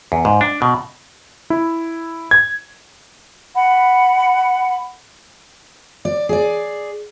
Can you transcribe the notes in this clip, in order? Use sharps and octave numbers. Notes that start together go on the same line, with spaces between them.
E2
G#2
D4
B2
E4
G#6
F#5 B5
D5
G#4 D5